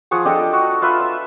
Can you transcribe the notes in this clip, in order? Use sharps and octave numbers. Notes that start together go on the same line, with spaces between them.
F3 G#4 F#5 C#6
D4 G4 A4 D#5
F#4
F4 B4 E5
E5